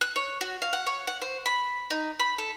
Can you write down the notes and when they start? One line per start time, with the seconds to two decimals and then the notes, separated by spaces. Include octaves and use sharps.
0.01 F#6
0.16 C#5
0.41 F#4
0.62 F5
0.73 F#5
0.87 C#5
1.07 F#5
1.22 C5
1.46 B5
1.90 D#4
2.20 B5
2.38 A4